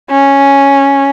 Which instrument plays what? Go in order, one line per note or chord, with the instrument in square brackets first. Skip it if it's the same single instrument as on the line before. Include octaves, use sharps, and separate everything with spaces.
[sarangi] C#4